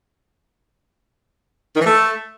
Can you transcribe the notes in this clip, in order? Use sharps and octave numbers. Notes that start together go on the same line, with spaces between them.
D#3
E3
A3